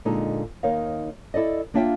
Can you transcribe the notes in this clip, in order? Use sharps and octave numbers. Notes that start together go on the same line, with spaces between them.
A#2 D3 G#3 D#4 A4
D#2 D#4 A#4 C#5 F5
E4 A4 D5 D#5
A#3 D4 F4 E5 F5 G5